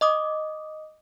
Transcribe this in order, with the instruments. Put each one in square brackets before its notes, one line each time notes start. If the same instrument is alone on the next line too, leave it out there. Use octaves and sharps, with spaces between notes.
[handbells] D#5 D6 D#6